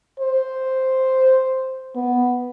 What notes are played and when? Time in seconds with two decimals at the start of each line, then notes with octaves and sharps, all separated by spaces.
0.20 C5
1.96 B3